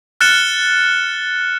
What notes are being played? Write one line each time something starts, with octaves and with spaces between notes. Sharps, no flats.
F6 F#6 A6 C#7 E7 G7